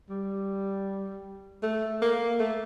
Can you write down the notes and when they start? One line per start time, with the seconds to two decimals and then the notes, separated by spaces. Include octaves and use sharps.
0.09 G3
1.62 A3
2.02 A#3
2.40 A3